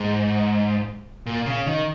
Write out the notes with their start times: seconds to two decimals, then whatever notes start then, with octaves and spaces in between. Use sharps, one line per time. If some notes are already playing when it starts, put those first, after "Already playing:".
Already playing: G#2
1.26 A#2
1.46 C#3
1.67 D#3